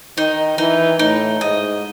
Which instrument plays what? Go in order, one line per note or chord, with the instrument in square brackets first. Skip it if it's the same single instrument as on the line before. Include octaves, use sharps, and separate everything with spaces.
[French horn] D#3 [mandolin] D#4
[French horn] E3 [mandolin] D#4
[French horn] A2 [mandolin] D#4
[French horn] G#2 [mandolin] D#5